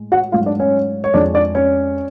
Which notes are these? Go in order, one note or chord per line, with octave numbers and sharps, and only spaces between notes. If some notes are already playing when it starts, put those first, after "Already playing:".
Already playing: A2 G#3
F#4 F#5
G#2 F#3 A3 F4 F5
D4 D5
C#4 C#5
C#5
F2 F3 G#3 D4 D5
D4 D5
C#4 C#5